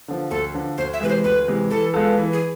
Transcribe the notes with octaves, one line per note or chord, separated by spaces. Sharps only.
D3 F3
D2 A4
D3 F3
D2 C5
E5
C3 E3 G#3 B4
C5
D2 B4
C3 E3 G#3
E3 A4
G#3 B3 F4 A4
E3
G#4